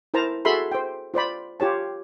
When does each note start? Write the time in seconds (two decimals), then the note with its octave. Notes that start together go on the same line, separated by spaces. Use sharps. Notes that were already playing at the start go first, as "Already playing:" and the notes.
0.14 E4 A#4 C5 A5 A#5
0.45 F#4 G#4 A4 E5 B5 C6
0.72 C5 G5
1.14 F4 C5 D5 B5
1.60 F4 G4 C#5 A5